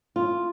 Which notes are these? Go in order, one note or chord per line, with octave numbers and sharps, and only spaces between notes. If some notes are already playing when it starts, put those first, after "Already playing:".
F4